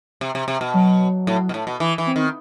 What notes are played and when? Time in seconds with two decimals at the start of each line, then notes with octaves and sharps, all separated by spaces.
0.21 C3
0.35 C3
0.48 C3
0.61 B2
0.74 F#3
1.27 A2
1.49 B2
1.54 A2
1.67 B2
1.80 E3
1.98 E3
2.07 C4
2.16 D#3